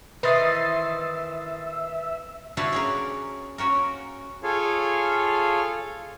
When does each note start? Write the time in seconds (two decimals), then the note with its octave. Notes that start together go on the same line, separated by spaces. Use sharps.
0.23 D#3 E3 B4 C5 E5 D#6 A6 C7
2.57 D4 E4 F#4 B4 F5 A5
2.73 C#4 G#4 A#4
3.58 A#3 C#4 F#4 A#4
4.43 F4 G#4 A4 C#5 F5